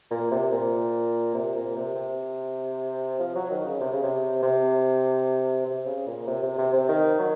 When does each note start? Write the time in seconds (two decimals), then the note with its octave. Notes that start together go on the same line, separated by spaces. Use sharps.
0.11 A#2
0.31 C3
0.52 A#2
1.34 C3
1.55 A#2
1.75 C3
1.95 C3
3.20 F3
3.35 F#3
3.51 D#3
3.65 C#3
3.81 C3
3.93 C#3
4.03 C3
4.43 C3
5.66 C3
5.86 C#3
6.07 A#2
6.27 C3
6.43 C3
6.58 C3
6.73 C3
6.88 D#3
7.19 F#3